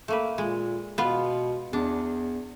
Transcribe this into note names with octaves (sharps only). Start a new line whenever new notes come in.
A3 A#3 B4
A#2 G#3
B2 B3 F4
E2 D4